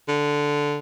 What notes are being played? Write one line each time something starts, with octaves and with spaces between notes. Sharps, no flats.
D3